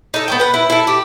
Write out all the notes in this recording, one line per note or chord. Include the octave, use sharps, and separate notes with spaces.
D#4 A4
B3 C#4 G5
B4 F#5
E4
E4 A4
G4